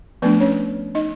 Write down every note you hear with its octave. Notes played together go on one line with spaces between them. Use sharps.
F3 A3 B3 D4 B4
C#4 C#5
D#4 D#5